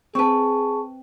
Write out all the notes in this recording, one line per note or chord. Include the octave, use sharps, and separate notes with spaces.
C4 G#4 B4 A5 C#6